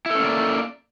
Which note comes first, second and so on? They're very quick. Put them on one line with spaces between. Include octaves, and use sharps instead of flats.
E4 A4 C#4 A#3 D5